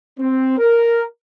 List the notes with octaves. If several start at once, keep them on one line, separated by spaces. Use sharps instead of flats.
C4
A#4